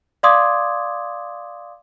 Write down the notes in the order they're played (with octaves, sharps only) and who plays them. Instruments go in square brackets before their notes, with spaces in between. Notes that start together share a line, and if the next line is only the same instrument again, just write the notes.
[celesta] D5 F5 C6 D6 D#6 G#6